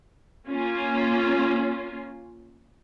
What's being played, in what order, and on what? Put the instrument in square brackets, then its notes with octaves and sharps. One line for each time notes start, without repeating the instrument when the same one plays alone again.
[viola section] A#3 C#4 F4